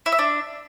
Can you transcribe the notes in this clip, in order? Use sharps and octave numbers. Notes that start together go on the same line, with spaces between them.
E4
E5
D4